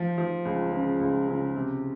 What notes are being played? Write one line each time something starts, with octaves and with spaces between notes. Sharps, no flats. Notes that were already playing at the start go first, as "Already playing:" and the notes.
Already playing: F3
F3
C#2
C#3
C#2
C#3
C3